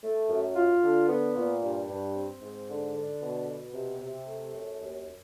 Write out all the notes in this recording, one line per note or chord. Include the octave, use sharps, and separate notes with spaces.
A3
F#2
F4
D3
B3
A#2
G2
G2
C4
G#2
D3
D3
B2
B2
C3
C3
A3
F#2
D#2